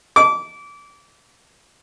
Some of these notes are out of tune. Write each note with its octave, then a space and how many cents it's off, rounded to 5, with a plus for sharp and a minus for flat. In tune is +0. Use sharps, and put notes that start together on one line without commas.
D6 -25